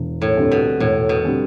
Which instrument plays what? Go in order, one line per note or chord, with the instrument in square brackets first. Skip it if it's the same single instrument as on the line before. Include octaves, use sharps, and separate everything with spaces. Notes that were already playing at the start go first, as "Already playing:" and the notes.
Already playing: [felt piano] E1
[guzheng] A2
[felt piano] D2 D3 G3 C4
[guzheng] B2
[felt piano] E1 [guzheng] A2
[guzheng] B2
[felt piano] D3 G3 C4